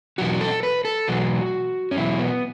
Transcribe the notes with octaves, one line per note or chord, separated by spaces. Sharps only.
E2 B2 F#3 F#4
A4
B4
A4
E2 B2 F#3 F#4
C#4
E2 B2 F#3 E4
B3